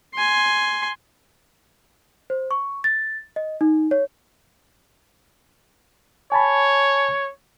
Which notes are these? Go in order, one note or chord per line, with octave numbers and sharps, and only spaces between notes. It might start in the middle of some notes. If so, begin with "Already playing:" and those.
G#5 C6
C5
C#6
A6
D#5
D#4
C#5
C#5 G#5 A5 B5